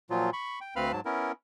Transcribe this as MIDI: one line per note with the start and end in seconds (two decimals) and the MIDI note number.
0.10 0.30 46
0.10 0.30 53
0.10 0.30 54
0.10 0.30 65
0.33 0.59 83
0.33 0.59 85
0.61 0.74 79
0.76 0.92 38
0.76 0.92 60
0.76 0.92 71
0.76 0.92 77
0.76 0.92 83
0.76 0.92 89
0.92 1.00 44
0.92 1.00 54
0.92 1.00 81
1.05 1.32 59
1.05 1.32 61
1.05 1.32 64
1.05 1.32 70